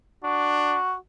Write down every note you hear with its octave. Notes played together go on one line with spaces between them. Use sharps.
D4 F#4